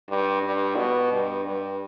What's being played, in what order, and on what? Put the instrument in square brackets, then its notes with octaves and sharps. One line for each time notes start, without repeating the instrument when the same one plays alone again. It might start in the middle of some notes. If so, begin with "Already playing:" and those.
[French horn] G2
G2
B2
G2
G2